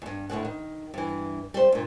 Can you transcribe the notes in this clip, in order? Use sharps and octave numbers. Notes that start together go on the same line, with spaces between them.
E2 G2
D2 A2 C#3 F#5
D#3
G2 E3
G3 C5
G2 A#2